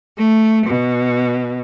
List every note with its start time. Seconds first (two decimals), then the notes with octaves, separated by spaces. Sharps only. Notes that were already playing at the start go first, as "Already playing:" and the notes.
0.17 A3
0.65 B2